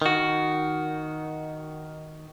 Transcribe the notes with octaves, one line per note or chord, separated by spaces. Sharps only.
D#3 F#4